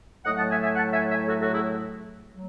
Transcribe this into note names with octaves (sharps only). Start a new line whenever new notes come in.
A2 F#3 A3 D#5 F#5
F#5 A5
E5 G#5
E5 G#5
F#5 A5
E5 G#5
E5 G#5
F#4 A4
F#4 A4
E4 G#4
F#3 A3